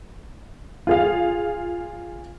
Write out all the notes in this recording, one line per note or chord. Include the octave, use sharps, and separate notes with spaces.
F4 G#4 F5